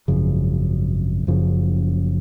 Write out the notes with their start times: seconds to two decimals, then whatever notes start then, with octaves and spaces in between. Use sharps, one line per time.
0.08 G#1 F#2 C#3 F3
1.27 F#1 F#2 C#3 F3